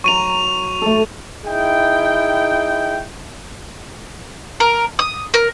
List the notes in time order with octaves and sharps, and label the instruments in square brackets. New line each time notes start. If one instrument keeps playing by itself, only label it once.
[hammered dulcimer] F#3 A#5 [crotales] C#6 D#7 F7
[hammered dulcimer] A3 A4
[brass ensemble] D#4 E4 G#4 G5
[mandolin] A#4
D#6
A#4